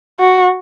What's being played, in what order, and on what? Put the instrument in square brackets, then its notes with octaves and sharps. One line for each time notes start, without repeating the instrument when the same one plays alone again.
[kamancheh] F#4